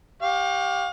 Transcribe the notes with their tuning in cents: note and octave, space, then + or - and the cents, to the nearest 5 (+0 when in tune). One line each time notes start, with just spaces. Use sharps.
G4 +0 F5 +35 C#6 +0